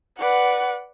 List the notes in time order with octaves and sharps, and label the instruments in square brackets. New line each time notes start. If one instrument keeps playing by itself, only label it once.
[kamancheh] B4 D5 [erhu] F#5